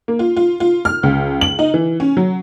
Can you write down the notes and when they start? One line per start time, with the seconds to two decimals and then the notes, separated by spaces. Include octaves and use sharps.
0.08 A#3
0.19 F4
0.37 F4
0.60 F4
0.85 F6
1.03 C#2
1.41 F#7
1.59 D#4
1.74 E3
2.00 C#4
2.17 F#3